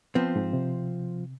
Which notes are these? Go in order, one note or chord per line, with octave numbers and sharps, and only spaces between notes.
F3 B3 C4
G#2
C3